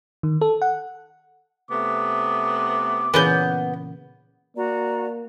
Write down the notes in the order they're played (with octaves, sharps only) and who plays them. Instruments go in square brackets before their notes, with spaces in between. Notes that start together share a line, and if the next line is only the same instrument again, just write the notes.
[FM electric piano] D#3
A4
F#5
[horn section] C3 A3 B3 [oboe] D6
[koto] A#2 C#3 E3 [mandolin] B3 G6
[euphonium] A#3 [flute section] F#4 D5 A#5